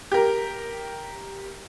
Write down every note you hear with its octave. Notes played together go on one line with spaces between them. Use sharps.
G4 A#4